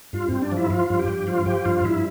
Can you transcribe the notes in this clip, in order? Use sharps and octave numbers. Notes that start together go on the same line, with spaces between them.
G2 F4
G2 C4
D4
F3
E4
F3 F4
G2
G4
G2
F3 F4
F3 G4
G2 F4
G2 E4